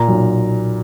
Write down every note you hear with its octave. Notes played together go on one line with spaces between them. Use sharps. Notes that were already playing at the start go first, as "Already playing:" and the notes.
Already playing: A#2 A#5
B1